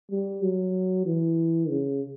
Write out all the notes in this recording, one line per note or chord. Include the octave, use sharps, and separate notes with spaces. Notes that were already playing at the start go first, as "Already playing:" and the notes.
G3
F#3
E3
C#3